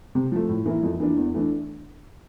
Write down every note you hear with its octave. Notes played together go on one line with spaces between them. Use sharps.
C3
F3 A3
A2
E3 A#3 E4
F2
E3 A#3 D4
E2
E3 A3 D4